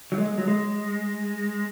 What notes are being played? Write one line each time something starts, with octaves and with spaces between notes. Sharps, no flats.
F#3
G#3
F#3
G#3